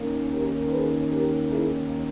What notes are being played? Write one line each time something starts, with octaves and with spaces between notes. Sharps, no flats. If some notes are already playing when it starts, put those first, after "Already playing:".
Already playing: D#2 D#3 A#3 C#4
G4 A#4
G#4 B4
G4 A#4
E4 G#4